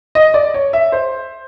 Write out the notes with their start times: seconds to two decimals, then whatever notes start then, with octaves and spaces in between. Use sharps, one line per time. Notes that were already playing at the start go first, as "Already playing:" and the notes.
0.15 D#5
0.34 D5
0.54 C#5
0.73 E5
0.92 C5